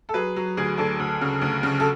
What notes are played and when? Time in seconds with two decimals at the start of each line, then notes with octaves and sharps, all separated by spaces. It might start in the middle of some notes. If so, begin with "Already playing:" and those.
0.09 A4
0.14 F#3 G#4 B4
0.36 F#3
0.57 D2 G#4
0.78 D2 A4
0.99 D2
1.21 C#3
1.41 D2
1.63 C#3
1.80 A4